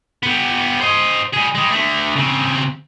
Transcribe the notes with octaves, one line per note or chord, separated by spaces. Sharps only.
G3 B3
C5 D#5
G3 G#4
G3 G#3
D3 A3
C#3 C4